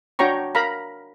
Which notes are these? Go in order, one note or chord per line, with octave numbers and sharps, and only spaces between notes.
D4 F#4 C#5 G5 A#5 C#6
A#4 F5 A#5 B5